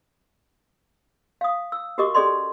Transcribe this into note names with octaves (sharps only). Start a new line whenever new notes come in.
F5 D#6
E6
F#4 G4 A#4 D#5 C#6 D6
C#4 G#4 A4 D5 D#5 C6